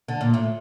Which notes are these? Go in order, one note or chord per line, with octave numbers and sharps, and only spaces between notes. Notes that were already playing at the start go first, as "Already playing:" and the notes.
D3
A#2
A2